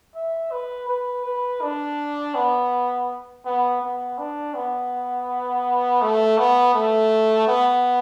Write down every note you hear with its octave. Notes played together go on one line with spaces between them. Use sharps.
E5
B4
B4
B4
D4
B3
B3
B3
D4
B3
A3
B3
A3
B3